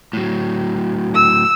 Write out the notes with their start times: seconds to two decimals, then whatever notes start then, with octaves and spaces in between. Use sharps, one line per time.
0.13 A2 F#3
1.14 E6